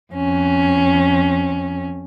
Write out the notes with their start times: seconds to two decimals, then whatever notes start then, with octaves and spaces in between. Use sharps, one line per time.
0.13 F2 C#4